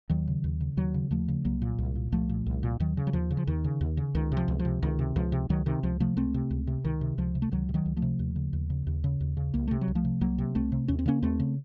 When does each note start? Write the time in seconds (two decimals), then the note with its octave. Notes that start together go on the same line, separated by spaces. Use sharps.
0.10 D#2 D#3 F#3
0.28 C#3
0.44 D#2
0.61 C#3
0.77 D#2 D#3 F#3
0.94 C#3
1.11 D#2 F3 A3
1.28 C#3
1.45 C2 F#3 A#3
1.62 A#2
1.78 C2
1.96 A#2
2.12 C2 F3 A3
2.29 A#2
2.46 C2
2.63 A#2
2.80 D#2 D#3 F#3
2.97 C#3
3.07 F#3
3.13 D#2 F3
3.31 C#3
3.37 F3
3.47 D#2 D#3
3.64 C#3
3.81 D#2
3.97 C#3
4.15 C#2 D#3
4.32 C3
4.37 F3
4.48 C#2
4.59 F3
4.65 C3
4.83 C#2 D#3
4.99 C3
5.16 C#2 F3
5.32 C3
5.49 C#2 D#3 F#3
5.66 C3 D#3
5.83 C#2 F3
6.00 C3 F3 A3
6.17 C#2 A3 C4
6.34 C3
6.51 C#2
6.67 C3
6.84 C#2 D#3
7.01 C3
7.18 C#2 F3
7.35 C3
7.42 A3
7.51 C#2 D#3 F#3
7.69 C3
7.74 D#3 F#3
7.86 C#2
7.97 F3 A3
8.02 C3
8.19 D#2
8.36 C#3
8.53 D#2
8.70 C#3
8.87 D#2
9.04 C#3
9.21 D#2
9.37 C#3
9.54 C2 A#3
9.68 C3 A3
9.81 F#3
9.88 C2
9.95 F3 A3
10.05 C3
10.21 C2 F#3 A#3
10.38 C3
10.55 C2 A3 C4
10.72 C3
10.88 D#2 C#4
10.99 C4
11.06 C#3 A#3 C#4
11.22 D#2 A3 C4
11.40 C#3